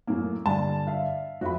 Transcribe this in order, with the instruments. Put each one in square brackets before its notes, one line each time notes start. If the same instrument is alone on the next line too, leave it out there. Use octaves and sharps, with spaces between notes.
[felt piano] F#2 A2 A#3
[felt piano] G2 D3 [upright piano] A5
[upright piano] E5 F5
[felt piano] F2 [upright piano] F#4 E5 B5